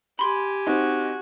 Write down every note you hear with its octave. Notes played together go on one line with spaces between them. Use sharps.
G4 G#5 B5 C6
C4 D#4 F#4